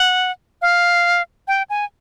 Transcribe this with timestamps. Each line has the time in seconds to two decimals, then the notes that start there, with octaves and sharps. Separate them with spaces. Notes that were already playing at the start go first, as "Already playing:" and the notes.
Already playing: F#5
0.62 F5
1.48 G5
1.70 G#5